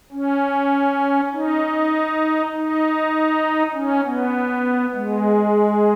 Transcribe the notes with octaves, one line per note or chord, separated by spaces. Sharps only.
C#4
D#4
D#4
C#4
B3
G#3